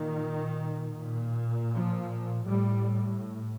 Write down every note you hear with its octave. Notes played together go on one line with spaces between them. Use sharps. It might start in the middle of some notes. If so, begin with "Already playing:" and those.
Already playing: A#2 D#3
A#2
F3
A2 G3